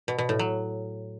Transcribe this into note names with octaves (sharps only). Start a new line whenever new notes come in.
B2
B2
A2
F#3